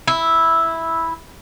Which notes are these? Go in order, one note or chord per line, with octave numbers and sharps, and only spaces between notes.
E4